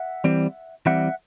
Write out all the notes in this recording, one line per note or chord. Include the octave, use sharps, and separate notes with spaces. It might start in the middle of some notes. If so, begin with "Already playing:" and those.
Already playing: E5 F#5
E3 G3 C4
E3 G3 C4 E5 F#5